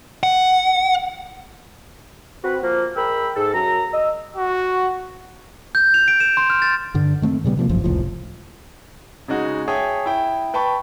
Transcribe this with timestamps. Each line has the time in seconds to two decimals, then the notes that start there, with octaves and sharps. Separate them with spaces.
0.23 F#5
2.44 C4 F#4 B4
2.62 F3 A#3
2.95 G#3 A#4 G5 B5 E6
3.36 G#2 A4
3.53 F#2 A#5
3.93 D#5 E6
4.36 F#4
5.75 G6
5.94 F7
6.08 D7
6.20 E7
6.37 C6
6.50 F6
6.62 A6
6.94 G2 D3
7.22 D#3 A3 B3 C4
7.44 A#2 C#3 G3 B3
7.57 C3 F3 G#3 A#3
7.69 D#1 G#1 F#2 F3
7.84 F1 C#2 A2 F3
9.28 C#3 G#3 D#4 F#4
9.68 G#4 C#5 E5 G5 A5 D#6
10.06 E4 G5
10.54 B4 G5 A5 B5 C#6